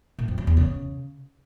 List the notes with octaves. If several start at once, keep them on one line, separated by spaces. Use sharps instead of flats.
A#2
F2
F#3
E2
C#3